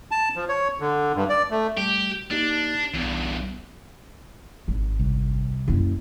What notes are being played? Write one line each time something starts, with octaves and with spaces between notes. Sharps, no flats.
A5
F3
C#5
D3
G2
D5
A3
G3 A3 G4
A#3 D4 D#4 G4
B1 E2 G2 B3
G#1
C2
F#1 E4